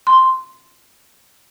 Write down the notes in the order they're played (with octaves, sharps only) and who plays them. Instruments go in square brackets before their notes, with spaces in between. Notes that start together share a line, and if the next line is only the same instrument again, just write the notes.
[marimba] C6